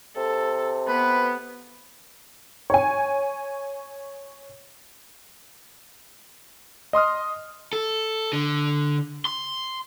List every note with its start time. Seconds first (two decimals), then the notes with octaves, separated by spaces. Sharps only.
0.16 C3 A4
0.88 B3 B4
2.70 C#5 G#5
6.93 D#5 C6 D#6 F6
7.73 A4
8.33 D3
9.25 C6